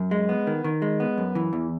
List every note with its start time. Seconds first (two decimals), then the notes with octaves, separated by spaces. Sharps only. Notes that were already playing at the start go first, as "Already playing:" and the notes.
Already playing: F#2
0.11 G#3
0.29 B3
0.47 D#3
0.64 D#3
0.82 G#3
1.00 B3
1.18 F#2
1.35 E3
1.53 E2